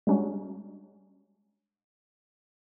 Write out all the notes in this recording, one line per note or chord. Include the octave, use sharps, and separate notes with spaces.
G3 G#3 C#4 D4 F#4